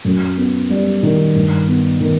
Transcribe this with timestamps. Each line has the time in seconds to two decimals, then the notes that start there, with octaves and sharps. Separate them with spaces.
0.05 F#2
0.37 B3
0.70 G3
1.03 D#3
1.35 G2
1.68 B3
2.01 D#3